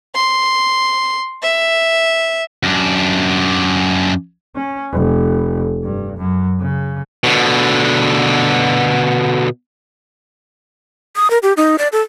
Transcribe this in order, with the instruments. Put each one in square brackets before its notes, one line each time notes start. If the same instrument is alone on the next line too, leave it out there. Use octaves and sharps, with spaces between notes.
[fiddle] C6
E5
[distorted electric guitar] F#2 D4
[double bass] C#4
F1
G2
F#2
C#3
[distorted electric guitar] B2 D3
[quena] D#6
A#4
G4
D#4
D5
A4